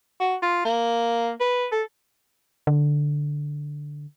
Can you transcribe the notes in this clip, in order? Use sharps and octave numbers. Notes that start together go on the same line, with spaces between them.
F#4
F4
A#3
B4
A4
D3